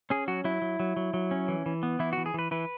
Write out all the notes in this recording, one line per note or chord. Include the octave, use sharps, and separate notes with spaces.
C#4 G#4
F#3 F#4
F#3 E4
F#3
F#3
F#3
F#3
C#4
E3
E3
B3
E3 E4
F#4
E3
G#4
E3 B4
E3 B4